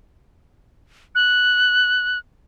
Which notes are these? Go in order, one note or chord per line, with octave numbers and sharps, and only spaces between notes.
F#6